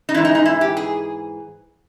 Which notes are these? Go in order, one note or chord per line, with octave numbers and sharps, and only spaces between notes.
D#4
G#2 E3 E4
D#4
D#4
E4
G4
G#4